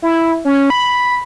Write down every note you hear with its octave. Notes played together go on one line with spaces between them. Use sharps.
E4
C#4
B5